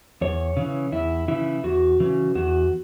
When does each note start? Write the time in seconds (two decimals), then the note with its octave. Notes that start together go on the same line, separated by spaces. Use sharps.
0.21 E2 C#5
0.57 C#3 E3
0.92 E2 E4
1.28 C#3 E3 E4
1.64 E2 F#4
2.00 C#3 E3
2.35 E2 F#4